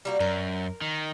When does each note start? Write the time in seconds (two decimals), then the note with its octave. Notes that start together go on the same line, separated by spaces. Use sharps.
0.05 G3 A#3 F#4
0.20 F#2 A#4
0.81 D#3